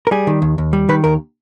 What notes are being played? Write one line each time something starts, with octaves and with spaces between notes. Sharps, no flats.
A#4
G3 G#4
D#3
D#2
D#2
G3
D#3 B4
D#2 A#4